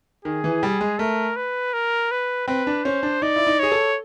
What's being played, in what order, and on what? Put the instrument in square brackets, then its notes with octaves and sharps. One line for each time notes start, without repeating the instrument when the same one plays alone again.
[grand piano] D#3 [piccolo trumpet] G#4
[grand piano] E3
G3
G#3
[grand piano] A3 [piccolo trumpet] A#4
[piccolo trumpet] B4
A#4
B4
[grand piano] C4 [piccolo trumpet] B4
[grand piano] D4
[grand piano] C#4 [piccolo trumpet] C5
[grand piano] D4
[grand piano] D#4 [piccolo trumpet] D5
[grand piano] E4
D#4
[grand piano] G#4 [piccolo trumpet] C#5
[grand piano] A4